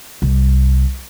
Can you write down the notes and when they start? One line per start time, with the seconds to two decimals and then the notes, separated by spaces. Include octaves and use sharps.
0.22 C2